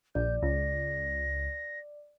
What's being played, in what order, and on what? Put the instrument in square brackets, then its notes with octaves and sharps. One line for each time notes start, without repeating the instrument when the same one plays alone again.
[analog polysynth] A#1 [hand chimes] D5 [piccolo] G6
[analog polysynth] C#2 [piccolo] A#6